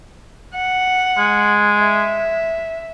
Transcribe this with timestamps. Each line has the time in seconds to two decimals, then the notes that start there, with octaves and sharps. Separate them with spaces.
0.55 F#5
1.17 G#3
1.81 E5